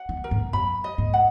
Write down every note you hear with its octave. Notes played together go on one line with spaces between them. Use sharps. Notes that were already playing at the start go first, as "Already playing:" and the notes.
Already playing: F#5
D#3
A#4
G#2
F#2 B5
D#5
G#2
F#5